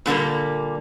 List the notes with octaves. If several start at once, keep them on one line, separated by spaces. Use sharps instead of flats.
A#2 D3 G3 A#3